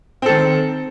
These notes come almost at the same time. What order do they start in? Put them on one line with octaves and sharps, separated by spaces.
C4 A4 D#3